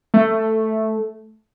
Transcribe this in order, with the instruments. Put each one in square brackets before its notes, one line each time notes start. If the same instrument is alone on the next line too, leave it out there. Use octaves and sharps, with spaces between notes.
[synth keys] A3